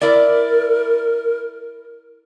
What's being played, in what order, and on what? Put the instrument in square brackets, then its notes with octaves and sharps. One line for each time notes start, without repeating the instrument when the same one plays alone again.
[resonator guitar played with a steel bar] E4 D5 [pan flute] A#4